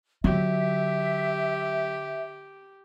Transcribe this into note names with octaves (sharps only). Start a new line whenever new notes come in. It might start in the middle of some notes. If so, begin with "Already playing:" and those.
D3 F#3 G4 E5